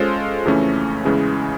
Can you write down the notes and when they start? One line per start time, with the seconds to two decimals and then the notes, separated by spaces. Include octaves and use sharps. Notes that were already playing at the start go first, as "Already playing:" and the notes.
Already playing: G#3 C#4 F4 A4 C5
0.45 F2 C#3 E3 A3 C#4
1.05 E2 C#3 E3 G#3 C#4